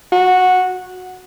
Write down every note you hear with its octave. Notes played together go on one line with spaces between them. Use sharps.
F#4